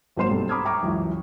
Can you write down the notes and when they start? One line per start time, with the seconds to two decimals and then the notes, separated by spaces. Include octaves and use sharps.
0.17 G#1 F#3 A#3 C5 C6 E7
0.29 B1 G2 C4 A4
0.49 A#5 B5 D6 D#6 F6 G#6
0.65 E5 G5 A#5 C#6 D6
0.82 C#2 F#2 E3